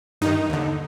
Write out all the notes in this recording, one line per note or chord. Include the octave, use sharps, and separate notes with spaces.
G2 D#3 D#4
D#2 D3